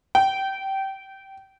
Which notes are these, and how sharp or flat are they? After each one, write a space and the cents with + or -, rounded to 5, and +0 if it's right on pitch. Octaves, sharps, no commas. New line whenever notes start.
G5 -20